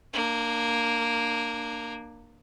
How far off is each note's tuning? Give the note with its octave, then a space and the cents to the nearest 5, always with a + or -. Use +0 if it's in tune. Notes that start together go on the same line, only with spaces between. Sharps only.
A#3 +0 D4 +25